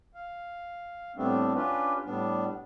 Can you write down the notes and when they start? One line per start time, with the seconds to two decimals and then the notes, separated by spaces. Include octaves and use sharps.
0.15 F5
1.16 A2 G3 A3 B3 C4 D4
1.55 C#4 D4 F4 G4 B4
2.04 A2 G3 B3 D4